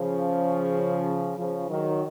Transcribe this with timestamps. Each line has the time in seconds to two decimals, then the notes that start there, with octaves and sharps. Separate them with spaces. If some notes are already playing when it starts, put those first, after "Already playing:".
Already playing: C#3 F3
1.37 C#3 F3
1.69 D#3 F#3